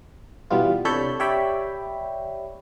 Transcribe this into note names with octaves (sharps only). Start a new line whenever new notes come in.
B2 E3 G3 B3 F4
C3 D4 A4 C#5 B5 G6
G4 C#5 D5 E5 G5 B5